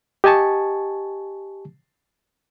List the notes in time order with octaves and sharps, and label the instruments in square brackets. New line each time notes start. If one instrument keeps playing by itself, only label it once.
[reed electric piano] G4 D#5 G#5 A5 C#6